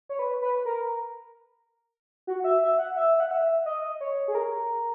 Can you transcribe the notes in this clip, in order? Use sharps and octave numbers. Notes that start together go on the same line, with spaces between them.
C#5
B4
B4
A#4
F#4
E5
E5
F#5
E5
F#5
E5
D#5
C#5
G#4
A#4